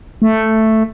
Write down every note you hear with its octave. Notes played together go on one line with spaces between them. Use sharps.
A3